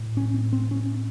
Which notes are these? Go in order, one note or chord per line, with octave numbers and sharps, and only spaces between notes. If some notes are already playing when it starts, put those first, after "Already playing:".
Already playing: A2
C#4
C4
C4
C#4